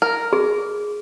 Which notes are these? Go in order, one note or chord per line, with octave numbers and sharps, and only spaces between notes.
A#4
G#4